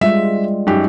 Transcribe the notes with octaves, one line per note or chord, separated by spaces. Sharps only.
G3 G#3 F4 E5
F#2 D#4 G4